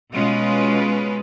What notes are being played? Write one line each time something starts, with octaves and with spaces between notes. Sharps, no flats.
B2 G#3 C#4 F4 B4